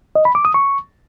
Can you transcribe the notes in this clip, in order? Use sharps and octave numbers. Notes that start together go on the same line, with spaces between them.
D#5
B5
D6
D#6
C#6